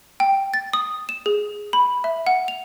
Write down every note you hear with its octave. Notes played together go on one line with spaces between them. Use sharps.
G5
A6
D#6
E7
G#4
B5
E5
F#5
F7